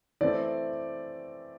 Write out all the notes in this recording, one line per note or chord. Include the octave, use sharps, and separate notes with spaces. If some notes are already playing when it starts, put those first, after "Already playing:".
E3 A3 C4 D5